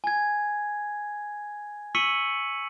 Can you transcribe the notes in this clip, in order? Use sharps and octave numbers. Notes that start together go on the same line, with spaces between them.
G#5 G#6
C#6 E6 B6 C#7 D#7 F#7